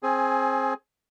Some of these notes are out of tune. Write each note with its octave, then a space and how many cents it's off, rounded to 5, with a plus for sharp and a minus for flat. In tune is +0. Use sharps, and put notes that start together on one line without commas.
C4 +20 G#4 +20 G#5 +0